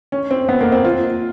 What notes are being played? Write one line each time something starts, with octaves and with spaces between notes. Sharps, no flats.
C#4
C4
B3
A#3
C4
F4